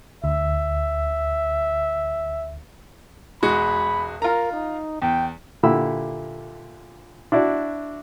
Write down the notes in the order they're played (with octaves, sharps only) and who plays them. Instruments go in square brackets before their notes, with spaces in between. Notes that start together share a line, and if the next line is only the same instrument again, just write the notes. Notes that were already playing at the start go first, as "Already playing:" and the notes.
[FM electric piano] D2 [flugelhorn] E5
[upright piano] E1 G#3 F#4 [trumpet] B5
[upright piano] F4 A#5 [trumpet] A#4
[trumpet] D#4
[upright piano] E2 [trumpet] G5
[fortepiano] A#2 D3 E4 G4 B5 E6
D4 E4 F#4 D5